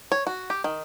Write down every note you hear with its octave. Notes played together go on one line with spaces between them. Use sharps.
C#5
F#4
G4
D#3